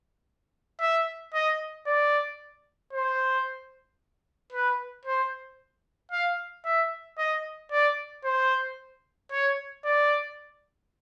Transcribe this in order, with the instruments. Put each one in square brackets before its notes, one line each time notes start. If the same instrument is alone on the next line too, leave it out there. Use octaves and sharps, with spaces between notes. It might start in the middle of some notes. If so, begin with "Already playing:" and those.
[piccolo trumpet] E5
D#5
D5
C5
B4
C5
F5
E5
D#5
D5
C5
C#5
D5